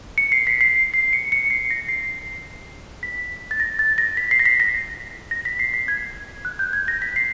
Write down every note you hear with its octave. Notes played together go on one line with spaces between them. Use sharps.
C#7
C7
B6
C7
C7
C#7
C#7
C7
A#6
C7
B6
A6
A#6
A6
A#6
B6
C7
A#6
B6
A#6
A#6
B6
C7
B6
G#6
F#6
G6
G#6
A#6
B6
C7